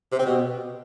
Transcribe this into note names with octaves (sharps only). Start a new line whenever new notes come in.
C3
C4
B2